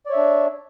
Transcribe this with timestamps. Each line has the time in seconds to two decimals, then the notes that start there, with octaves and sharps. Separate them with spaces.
0.06 D5
0.10 C#5
0.13 E5
0.17 D4